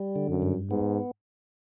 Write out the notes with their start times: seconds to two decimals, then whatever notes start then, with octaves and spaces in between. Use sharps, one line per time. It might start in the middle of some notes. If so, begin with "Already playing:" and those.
Already playing: G3
0.16 D3
0.29 F#2
0.42 G2
0.70 G#2 B3